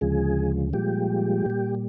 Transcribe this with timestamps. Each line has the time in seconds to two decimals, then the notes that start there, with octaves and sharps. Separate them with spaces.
0.01 D2 C#3 F3 G#3 G#4
0.73 A#2 F3 G3 G#3 G4
1.46 A#2 G3